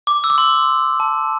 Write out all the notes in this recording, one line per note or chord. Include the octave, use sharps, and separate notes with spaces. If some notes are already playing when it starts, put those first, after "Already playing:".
D6
E6
D6
C6
A5